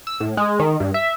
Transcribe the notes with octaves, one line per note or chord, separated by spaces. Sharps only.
E6
A2
G#3
D#3
G2
E5